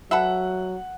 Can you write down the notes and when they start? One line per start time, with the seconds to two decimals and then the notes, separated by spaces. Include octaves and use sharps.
0.11 F#3 A4 B4 E5 F#5